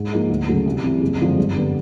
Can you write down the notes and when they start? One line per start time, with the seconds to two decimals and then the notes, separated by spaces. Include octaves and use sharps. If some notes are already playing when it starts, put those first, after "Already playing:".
Already playing: G#2
0.11 F3 A#3 D#4 G#4
0.30 D2
0.48 C#3 F#3 A3
0.66 C2
0.84 C3 E3 G3
1.01 F#1
1.19 F2 D3 F3 G#3
1.37 G2
1.56 D3 G3 B3